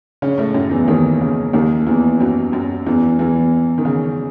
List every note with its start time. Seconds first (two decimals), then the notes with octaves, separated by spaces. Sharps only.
0.22 C#3 C#4
0.38 A2 A3
0.54 F#2 F#3
0.71 E2 E3
0.88 D#2 D#3
1.21 C#3
1.53 D#2 D#3
1.87 E2 E3
2.20 F#2 F#3
2.52 F#2 F#3
2.87 E2 E3
3.19 E2 E3
3.78 D#3
3.85 C#3